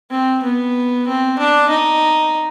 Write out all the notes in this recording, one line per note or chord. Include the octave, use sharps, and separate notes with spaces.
C4
B3
C4
D4
D#4